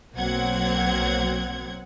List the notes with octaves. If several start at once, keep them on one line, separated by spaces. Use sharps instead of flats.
B1 F#3 A#3 C4 F#5 G#6